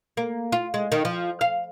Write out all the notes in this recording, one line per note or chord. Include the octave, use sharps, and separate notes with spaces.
A#3
F4
G#3
D#3
F3
F5